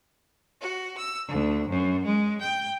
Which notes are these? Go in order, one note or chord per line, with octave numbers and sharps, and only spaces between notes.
F#4
E6
D2
F#2
G#3
G5